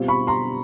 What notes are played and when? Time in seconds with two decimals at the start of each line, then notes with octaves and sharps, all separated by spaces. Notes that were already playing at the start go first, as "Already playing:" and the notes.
Already playing: B2 G3 C4 F4
0.08 B5 C#6
0.27 A#5 C6